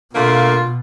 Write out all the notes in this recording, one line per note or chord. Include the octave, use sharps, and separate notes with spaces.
B2 D3 A3 A#3 F4